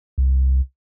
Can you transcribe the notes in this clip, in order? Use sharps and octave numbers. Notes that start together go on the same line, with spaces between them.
C2